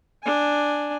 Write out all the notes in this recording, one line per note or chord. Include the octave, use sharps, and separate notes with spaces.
D4 G#5